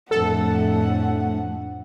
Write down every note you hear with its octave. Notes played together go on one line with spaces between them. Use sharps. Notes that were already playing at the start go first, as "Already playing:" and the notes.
F2 A2 F3 A3 D4 A4 F#5